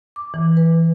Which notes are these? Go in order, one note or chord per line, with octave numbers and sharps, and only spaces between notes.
D6
E3
B4